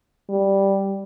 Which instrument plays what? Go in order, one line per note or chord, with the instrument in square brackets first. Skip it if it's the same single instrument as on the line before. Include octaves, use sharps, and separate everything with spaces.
[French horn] G3